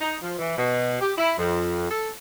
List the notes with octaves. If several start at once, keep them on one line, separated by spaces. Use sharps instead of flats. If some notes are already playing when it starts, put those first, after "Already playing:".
D#4
F3
E3
B2
G4
E4
F2
A4